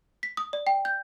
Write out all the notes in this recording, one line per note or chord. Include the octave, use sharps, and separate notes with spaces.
B6
D#6
D5
G5
G6